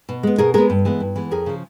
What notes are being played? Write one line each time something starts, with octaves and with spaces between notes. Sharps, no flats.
B2
G#3 B3
B2 G#4 A#4
G#3 B3 G#4 A#4
G2
E3 G#3 B3
G2
E3 G#3 B3
F2 G#4 A#4
C#3 F3